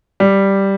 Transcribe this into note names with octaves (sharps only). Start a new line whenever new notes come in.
G3